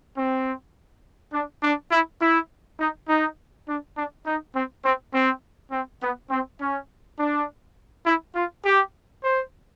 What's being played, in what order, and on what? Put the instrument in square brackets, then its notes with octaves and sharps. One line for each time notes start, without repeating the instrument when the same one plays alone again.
[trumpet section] C4
D4
D4
E4
E4
D#4
D#4
D4
D4
D#4
C4
C4
C4
C4
B3
C4
C#4
D4
E4
F4
G4
C5